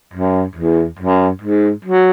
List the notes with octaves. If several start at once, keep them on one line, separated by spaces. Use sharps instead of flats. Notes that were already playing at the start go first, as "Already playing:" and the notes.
F#2
E2
F#2
G#2
F#3